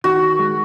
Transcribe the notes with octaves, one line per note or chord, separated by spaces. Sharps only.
D#3 F#4
G#3